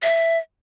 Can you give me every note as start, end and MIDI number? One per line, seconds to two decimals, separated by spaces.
0.03 0.38 76